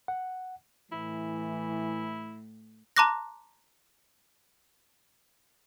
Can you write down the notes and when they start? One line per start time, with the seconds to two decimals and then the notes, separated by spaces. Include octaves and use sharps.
0.08 F#5
0.92 A2 E3 E4
2.97 A5 A#5 C6 D6 F#6 A#6